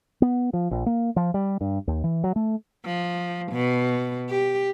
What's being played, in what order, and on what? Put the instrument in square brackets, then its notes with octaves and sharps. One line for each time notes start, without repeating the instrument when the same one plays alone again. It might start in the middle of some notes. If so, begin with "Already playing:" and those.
[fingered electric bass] B3
F3
A#1
A#3
F3
G3
G2
D#2
E3
F#3
A3
[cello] F3
B2
G4